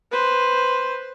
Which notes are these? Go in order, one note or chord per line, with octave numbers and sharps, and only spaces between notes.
B4 C5